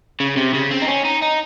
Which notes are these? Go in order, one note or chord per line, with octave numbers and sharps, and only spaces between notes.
C#3
C3
C#3
C4
D#4
C#4
D#4
D#4